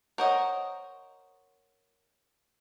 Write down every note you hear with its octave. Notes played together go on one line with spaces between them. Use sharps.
A#4 C5 C#5 D#5 F#5 C#6